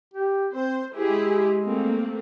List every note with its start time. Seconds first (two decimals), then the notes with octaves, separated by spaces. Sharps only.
0.14 G4
0.52 C4 C5
0.95 G#3 E4 G4 G#4
1.65 A3 A#3 C4